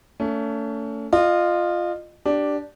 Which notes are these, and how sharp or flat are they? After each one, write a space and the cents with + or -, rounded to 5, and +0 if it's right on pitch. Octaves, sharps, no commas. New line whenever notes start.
A3 +25 C#4 +35
F4 +0 D#5 -30
D4 +0 G4 -10